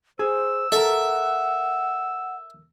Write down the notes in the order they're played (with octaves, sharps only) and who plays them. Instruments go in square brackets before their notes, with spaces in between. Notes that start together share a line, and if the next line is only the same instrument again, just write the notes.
[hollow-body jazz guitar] G#4 [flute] C5 [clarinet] E6
[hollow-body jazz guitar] A4 A#4 [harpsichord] E5 [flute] F#5